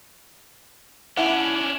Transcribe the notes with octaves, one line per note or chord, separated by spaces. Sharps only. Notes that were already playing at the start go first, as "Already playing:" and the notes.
C#4 D4 E4 F#5